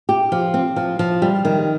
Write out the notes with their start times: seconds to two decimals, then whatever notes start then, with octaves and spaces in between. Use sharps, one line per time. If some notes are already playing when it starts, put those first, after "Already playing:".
0.09 G4
0.32 F3
0.54 C4
0.76 F3
0.99 F3
1.22 G3
1.45 D#3